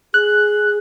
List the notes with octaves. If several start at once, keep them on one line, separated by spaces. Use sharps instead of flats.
G#4 F#6